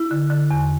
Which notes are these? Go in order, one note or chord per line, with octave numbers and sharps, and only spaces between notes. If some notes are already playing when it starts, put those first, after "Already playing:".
Already playing: E4
D3
D3
E2